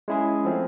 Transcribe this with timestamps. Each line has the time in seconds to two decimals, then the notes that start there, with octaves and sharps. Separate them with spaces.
0.08 G#3 C#4 E4 G#4
0.45 F3 A3 C4